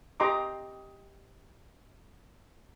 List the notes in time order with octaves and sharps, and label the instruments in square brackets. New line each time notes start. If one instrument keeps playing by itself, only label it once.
[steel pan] G4 D#5 A#5 C6 D6